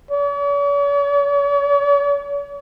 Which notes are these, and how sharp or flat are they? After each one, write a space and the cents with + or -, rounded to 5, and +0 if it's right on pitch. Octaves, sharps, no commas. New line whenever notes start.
C#5 +45